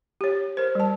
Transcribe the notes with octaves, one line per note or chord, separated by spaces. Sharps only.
G4 C#5
A#4 C5
G3 A5